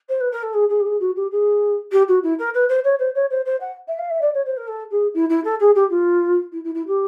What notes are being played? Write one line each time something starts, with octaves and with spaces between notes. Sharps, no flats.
C5
B4
A#4
A4
G#4
G#4
G4
G#4
F#4
G4
G#4
G4
F#4
E4
A#4
B4
C5
C#5
C5
C#5
C5
C5
F#5
E5
F5
E5
D5
C#5
C5
A#4
A4
G#4
E4
E4
A4
G#4
G4
F4
E4
E4
E4
G4